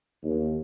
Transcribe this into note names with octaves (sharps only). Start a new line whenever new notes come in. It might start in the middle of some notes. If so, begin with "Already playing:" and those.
D#2